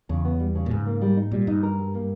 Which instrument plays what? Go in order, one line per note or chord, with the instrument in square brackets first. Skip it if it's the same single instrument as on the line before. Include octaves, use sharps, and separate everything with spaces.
[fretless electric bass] E2 [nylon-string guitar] C#3
[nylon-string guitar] B3
G3
C#3
[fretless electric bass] A#2
[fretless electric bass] G#2 [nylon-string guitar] C#3
[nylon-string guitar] A#3
G3
D#4
[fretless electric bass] A#2 [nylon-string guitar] G3
[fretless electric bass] G2 [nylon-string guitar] D#4
[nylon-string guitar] A#4
G3
A#3